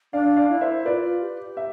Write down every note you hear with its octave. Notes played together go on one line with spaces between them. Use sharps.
D4 D5 F5
D5 F5
E4
C5 E5
F4 B4 D5
G4
E5